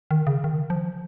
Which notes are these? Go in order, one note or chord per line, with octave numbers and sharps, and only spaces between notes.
D#3
C#3
D#3
F3